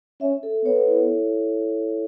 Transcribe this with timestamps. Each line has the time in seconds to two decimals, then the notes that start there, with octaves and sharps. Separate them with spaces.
0.21 C#4 E5
0.43 A4
0.65 B3 C#5
0.87 E4